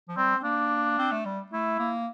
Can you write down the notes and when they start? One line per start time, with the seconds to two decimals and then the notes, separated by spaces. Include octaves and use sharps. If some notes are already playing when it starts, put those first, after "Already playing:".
0.09 F3
0.17 G3 C4
0.36 C4
0.44 A#3 D4
0.99 C4
1.12 A3
1.25 G3
1.52 A3 E4
1.79 A#3